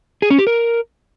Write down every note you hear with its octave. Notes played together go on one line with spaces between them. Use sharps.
G#4
C#4
G4
A#4